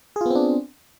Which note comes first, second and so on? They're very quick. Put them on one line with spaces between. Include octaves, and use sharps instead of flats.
G#4 F4 B3 C4 D4